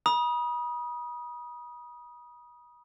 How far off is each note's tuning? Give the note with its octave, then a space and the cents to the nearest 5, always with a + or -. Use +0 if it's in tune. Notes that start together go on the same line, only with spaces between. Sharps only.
B5 -40 D#6 +0